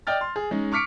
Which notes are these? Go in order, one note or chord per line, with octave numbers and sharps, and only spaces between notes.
D5 D#5 G5 F6 A6
C6
G#4
G#3 C#4 D#4
C#6 D6 F6 B6 C#7 D7